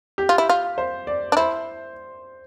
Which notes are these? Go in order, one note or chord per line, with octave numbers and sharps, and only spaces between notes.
G4
F4
E4
F4
C5
D5
D4
E4 C5